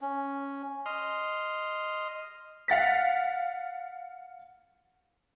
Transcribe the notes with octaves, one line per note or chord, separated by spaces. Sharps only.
C#4
D#5 C6 F6
F5 F#5 A6 B6